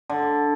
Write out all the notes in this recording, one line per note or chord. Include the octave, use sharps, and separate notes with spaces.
D3